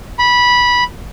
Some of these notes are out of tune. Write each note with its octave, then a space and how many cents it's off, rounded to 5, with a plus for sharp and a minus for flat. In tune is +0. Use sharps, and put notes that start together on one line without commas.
B5 -15